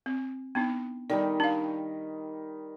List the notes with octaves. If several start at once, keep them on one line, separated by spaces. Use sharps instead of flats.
C4
B3 D4 D#4
D#3 G3 D#4 D5
D4 F5